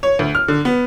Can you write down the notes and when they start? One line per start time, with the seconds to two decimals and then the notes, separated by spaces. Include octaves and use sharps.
0.03 C#5
0.19 D2
0.35 F6
0.48 D3
0.65 B3